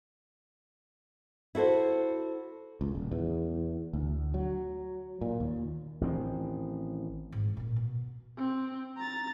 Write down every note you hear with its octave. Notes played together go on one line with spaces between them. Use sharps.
E4 F#4 A4 C5
C#2
D#1
E2
D2
F#3
A#2
D#2
A1 D#3 C4
G#2
A#2 D3
B2
C4
A#5 A6